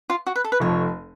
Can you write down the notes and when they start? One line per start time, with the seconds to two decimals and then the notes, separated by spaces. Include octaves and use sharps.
0.10 F4
0.27 F#4
0.36 B4
0.44 A4
0.52 B4
0.60 F1 F2 F3 C#5